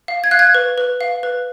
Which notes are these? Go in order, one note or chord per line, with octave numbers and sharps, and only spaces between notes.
F5
G#6
F5 F#6
G#6
B4
B4
F5
B4